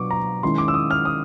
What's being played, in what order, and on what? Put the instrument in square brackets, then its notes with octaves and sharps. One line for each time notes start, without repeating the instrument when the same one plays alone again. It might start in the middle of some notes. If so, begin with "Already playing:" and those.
Already playing: [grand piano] B2 F#3 B3 D4 C#6 D6
A#5
D#3 G#3 C#4 E4 C6
D6
E6
D#6
F6
D#6